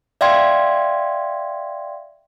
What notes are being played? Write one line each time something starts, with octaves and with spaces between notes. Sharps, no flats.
D5 E5 F5 G5 C6 G#6